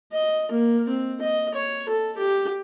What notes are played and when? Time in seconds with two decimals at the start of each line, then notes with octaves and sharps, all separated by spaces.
0.12 D#5
0.51 A#3
0.89 C4
1.21 D#5
1.54 C#5
1.89 A4
2.17 G4